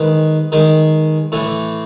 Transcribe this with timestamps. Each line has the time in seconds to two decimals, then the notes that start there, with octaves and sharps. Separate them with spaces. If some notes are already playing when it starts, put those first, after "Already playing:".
Already playing: D#3 G#3 B4
0.52 D#3 G#3
1.32 A2 E3 A3